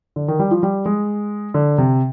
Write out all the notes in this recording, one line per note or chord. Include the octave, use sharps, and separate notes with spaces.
D3
D#3
G3
F3
G3
G#3
D3
C3